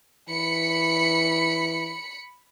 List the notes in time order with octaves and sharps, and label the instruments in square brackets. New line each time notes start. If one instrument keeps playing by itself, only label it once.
[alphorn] E3 [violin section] B5 C#7